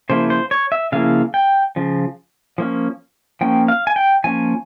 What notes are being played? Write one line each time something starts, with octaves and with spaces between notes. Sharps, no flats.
C#3 F3 A#3 E4 C5
C5
C#5
E5
C#3 F3 A#3 E4 F5
G5
C#3 F3
F3 A#3 C#4
F3 A#3 C#4 G5
F5
G#5
G5
F3 A#3 C#4 G#5